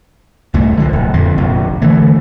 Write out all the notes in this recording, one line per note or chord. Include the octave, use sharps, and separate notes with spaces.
C2 G#2 A3
D3 F3
D1
F2 D3
F1 A#1
D3 E3 A3